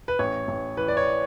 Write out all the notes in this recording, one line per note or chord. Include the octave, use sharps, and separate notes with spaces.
B4
A1 C#5
A1
E3 B4
D5
C#5